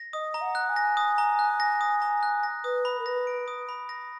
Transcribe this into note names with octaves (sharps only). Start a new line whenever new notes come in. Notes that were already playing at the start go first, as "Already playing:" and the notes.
Already playing: A#6
D#5 D#6
A#5
F#5
F#6
G#5
A#6
D#6
A#5
F#6
A#6
D#6
A#5
F#6
A#6
B4 D#6
B5
A#4
B4 A#6
D7
D#6
B5
A#6